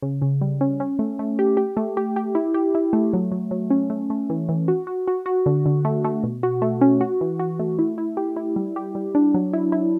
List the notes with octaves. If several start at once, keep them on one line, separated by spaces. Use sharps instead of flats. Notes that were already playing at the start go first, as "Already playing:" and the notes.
C#3
C#3
G3
C#4
C#4
A3
A3
G4
G4
A3
G4
G4
E4
G4
E4
A3
F#3
F#3
F#3
C#4
A3
A3
E3
E3
F#4
F#4
F#4
F#4
D3
D3
A3
A3
B2
F#4
A3
C#4
F#4
E3
F#4
A3
E4
E4
G4
E4
G3
G4
G3
D4
F#3
E4
E4